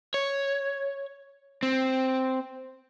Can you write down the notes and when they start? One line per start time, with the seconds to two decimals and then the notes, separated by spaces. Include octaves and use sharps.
0.14 C#5
1.63 C4